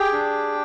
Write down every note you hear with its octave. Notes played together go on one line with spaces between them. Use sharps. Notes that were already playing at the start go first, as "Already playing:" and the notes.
Already playing: G4 G#4 G5
D4